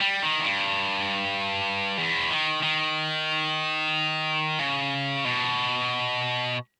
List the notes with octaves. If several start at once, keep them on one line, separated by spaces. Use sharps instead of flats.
G3
D#3
E2
G2
E2
D#3
D#3
C#3
B2